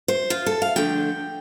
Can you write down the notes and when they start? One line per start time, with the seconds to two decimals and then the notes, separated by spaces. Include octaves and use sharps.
0.08 C5
0.30 F4
0.46 A4
0.62 F5
0.76 D3 F3 A3 G5